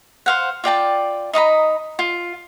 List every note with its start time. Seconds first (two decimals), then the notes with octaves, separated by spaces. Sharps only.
0.26 C5 F5 F#5
0.64 F4 D5 G5 A5
1.33 D#4 D#5 A#5 B5
1.99 F4